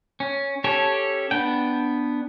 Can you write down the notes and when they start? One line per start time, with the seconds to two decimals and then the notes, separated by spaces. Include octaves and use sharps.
0.20 C#4
0.64 C#4 G4 A4 C#5
1.31 B3 D4 G5